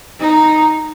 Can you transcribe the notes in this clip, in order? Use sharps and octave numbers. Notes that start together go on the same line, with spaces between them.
D#4